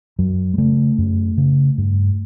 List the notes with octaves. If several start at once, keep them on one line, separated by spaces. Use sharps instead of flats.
F#2 F#3
G3
C#3 A3
F#2
C#3
G2